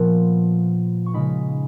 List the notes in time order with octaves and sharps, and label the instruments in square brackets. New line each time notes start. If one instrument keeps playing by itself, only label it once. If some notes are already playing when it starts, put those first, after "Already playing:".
Already playing: [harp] A#2 F3 B3
C#6
C#3 G#3 D#4 B5